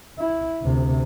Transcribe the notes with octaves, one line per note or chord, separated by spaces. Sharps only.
E4
D2 C3